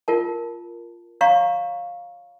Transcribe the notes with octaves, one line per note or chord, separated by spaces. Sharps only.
F4 A#4 A5
C#5 F5 A#5 C#6